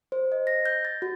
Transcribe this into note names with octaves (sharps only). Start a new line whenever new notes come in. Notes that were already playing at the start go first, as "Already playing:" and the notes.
C5
D#5
A#6
G6
A6
F#4